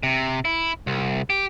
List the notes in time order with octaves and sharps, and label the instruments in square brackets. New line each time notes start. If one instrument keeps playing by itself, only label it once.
[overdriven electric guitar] C3
E4
C2
G4